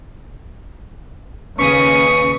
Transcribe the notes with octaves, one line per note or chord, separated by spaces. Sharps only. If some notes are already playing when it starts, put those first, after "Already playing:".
D#2 C#3 C#4 B4 C#6 D#6